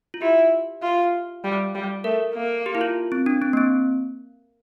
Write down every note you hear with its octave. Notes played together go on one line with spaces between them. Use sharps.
F4
E4 G4
F4
G3
G3
A3 A#4
A#3
G4
E4
F4
C4
D4
C4
A#3
C4